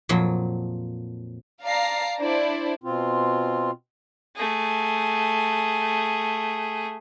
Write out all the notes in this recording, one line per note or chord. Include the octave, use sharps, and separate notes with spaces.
F2 A#2 F3 F#3
D5 F5 A5 A#5 C7
D4 E4 C5 D5
B2 C4 F4
A3 G#4